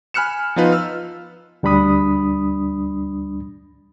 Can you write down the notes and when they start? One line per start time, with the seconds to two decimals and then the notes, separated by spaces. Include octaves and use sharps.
0.14 G#5 B5 F6 F#6 C#7 E7
0.56 F3 B3 D#4 F4 B4
0.72 E6 F6
1.63 D2 G3 D4 B5 D#6